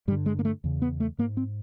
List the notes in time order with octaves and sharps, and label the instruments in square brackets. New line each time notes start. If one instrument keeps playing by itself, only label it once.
[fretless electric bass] G2 G3
D3
G#3
A#3
A3
E2 C#3
B3
A3
G#2 A#3
C4